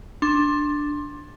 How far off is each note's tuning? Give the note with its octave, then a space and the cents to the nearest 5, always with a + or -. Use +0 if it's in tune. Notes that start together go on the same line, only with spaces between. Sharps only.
D4 +0 C6 +20